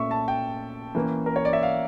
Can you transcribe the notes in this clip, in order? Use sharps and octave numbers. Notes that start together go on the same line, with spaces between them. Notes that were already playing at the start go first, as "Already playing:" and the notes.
Already playing: A#2 A3 C#4 E5 C#6
A5
G5
E3 A#3 C#4
A#4
C#5
D5
E5
F5